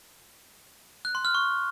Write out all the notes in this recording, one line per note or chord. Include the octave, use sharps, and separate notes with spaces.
F#6
C6
F6
C#6